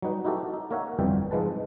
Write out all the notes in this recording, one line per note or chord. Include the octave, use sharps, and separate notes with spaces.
F#3 G3 D#4 B4
D#4 E4 F#4 G4 A4
D#4
A#3 A#4 C#5 E5 F#5
G1 F2 E3 G3 G5
G#2 F3 G#3 B4 A5